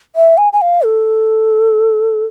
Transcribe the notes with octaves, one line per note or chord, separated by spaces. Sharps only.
E5
G#5
G#5
F5
A4